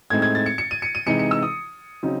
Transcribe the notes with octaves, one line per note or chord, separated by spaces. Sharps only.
A2 G#3 C4 D#4 G#6
G#6
A6
C#7
C#7
D#7
C#7
D#7
C3 E3 G#3 D#4 C#7
C#7
E6
D#6
C#3 F#3 C4 D#4